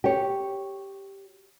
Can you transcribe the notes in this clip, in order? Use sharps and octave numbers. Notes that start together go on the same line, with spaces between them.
G4 C#5